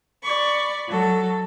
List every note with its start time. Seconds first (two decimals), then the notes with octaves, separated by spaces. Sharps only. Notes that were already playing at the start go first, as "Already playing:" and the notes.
0.21 D5 B5 C#6
0.88 F#3 A4